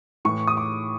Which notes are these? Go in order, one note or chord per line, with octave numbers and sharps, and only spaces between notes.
A2 E3 C#6
D#6
D6